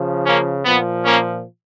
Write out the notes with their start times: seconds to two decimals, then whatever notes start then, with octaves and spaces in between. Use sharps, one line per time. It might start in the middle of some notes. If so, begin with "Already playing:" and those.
Already playing: C#3 F3
0.26 A#3 C#4
0.65 A#2 F3 B3
1.05 A#3 C#4